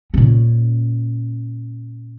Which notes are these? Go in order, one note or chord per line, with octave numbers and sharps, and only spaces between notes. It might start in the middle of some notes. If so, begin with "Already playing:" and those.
A#2 C#4